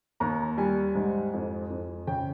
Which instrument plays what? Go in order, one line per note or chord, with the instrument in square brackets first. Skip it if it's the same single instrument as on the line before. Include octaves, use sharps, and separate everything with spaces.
[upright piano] D#2 A#5
G3 G#5
G#2
F2
F2
C#3 G5